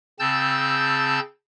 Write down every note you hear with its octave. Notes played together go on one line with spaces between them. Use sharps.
C#3 C4 A5 E6 G6 A6